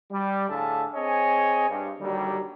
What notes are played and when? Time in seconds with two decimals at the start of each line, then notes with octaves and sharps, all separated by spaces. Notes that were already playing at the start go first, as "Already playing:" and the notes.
0.11 G3
0.50 A2 D3 G#4 E5 F5 A5
0.95 C4 G#4 C#5 D#5 G#5
1.69 G2
2.00 D#2 D3 F#3 G3